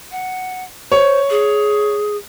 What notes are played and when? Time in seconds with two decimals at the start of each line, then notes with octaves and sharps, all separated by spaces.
0.11 F#5
0.92 C5 C#5
1.30 G#4